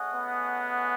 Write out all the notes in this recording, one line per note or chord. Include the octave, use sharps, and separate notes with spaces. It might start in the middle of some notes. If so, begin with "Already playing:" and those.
Already playing: A3 C#4 G#4 D#5 F#5
B3